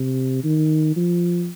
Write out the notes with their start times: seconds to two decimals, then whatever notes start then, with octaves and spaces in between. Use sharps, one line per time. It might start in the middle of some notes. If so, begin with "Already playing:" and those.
Already playing: C3
0.44 D#3
0.96 F3